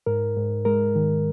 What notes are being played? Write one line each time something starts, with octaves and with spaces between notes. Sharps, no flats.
G#2 A#4
G#2
G#3 A#4
D#3